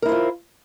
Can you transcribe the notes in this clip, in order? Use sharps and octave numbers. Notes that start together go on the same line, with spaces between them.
E4 F4 A#4 C5